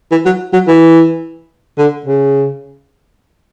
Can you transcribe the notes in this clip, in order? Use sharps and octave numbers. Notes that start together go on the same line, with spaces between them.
E3
F#3
F#3
E3
D3
C#3